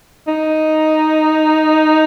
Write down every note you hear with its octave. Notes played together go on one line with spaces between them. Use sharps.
D#4